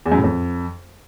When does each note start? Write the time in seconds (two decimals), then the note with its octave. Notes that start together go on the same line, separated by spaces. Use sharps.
0.06 E2
0.12 F#2
0.18 A2
0.24 F2